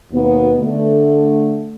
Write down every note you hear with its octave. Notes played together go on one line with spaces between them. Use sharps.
D#2 B2 B3
D3 A3